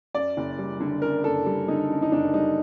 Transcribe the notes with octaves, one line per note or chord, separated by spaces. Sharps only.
F#2 D5
F#1
G3
D3
F#2 A#4
F#1 A4
G3
D3 D#4
F#2
D#4
F#1 D4
G3 D#4